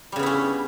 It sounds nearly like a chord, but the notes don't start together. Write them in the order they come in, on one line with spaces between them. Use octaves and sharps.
G3 C#3 B3 E4 C#4